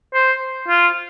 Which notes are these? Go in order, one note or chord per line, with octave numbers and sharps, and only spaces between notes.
C5
F4